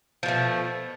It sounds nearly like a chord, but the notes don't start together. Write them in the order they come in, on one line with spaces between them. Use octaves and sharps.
F3 B2 A3